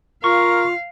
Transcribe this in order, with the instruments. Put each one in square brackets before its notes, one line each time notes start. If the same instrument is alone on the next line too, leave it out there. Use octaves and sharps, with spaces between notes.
[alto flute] F4 [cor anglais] A#4 [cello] F5 [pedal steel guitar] C#6